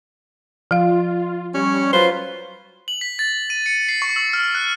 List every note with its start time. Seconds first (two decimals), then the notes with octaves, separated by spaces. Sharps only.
0.71 F3 F4 F5
1.54 G3 C#4 C#5
1.93 F#3 F4 B4 C5
2.88 F#7
3.01 B6
3.19 A6
3.50 D#7
3.66 C#7
3.89 C7
4.02 C#6
4.16 E6
4.33 F6
4.55 F#6